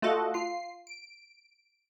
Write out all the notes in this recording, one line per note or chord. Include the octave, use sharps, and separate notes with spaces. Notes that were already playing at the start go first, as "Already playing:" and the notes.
A3 F4 F#4 A4 D#5 F#5
F4 C7
D7